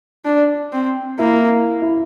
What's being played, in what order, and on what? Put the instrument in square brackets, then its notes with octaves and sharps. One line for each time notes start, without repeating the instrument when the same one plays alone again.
[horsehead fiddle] D4
C4
[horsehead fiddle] A#3 [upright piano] E4
[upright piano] E4